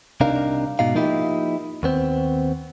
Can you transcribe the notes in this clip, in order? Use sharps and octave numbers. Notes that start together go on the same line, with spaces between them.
C2 C3 D4 D#4 A#4 F5
G#2 B2 D#4 F5
F3 A#3 D#4 E4 G4
D#2 B3 C4